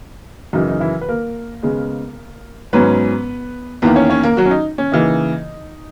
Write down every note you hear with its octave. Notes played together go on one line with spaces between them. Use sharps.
F#2 C#3 E3 D#4
D#4
E3 E4
B4
A#3 A#4
C#3 G#3 B3
G#2 F#3 B3 C#4 B4
E2 D#3 A#3 B3 B4
C#4 C#5
C#4 C#5
A#3 A#4
F#3 F#4
C#4
D#4
C#4
C#3 E3 A#3 D#4